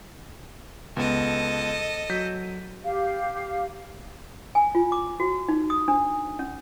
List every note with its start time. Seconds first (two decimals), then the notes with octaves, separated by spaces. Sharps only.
0.97 C#2 B3 A4 D#5
2.10 F#3 G6 B6
2.84 G4 F5
4.55 G#5
4.75 F4
4.92 D6
5.20 F#4
5.48 D#4
5.70 D#6
5.88 D4
6.39 C#4